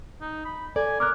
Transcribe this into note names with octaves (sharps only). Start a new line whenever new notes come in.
D#4
B5
A4 D5 G#5
A#4 D6 F#6